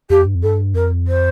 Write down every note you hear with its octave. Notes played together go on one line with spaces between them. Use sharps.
F2 G4
G2
F2
G2 A4
F2 A#4
C5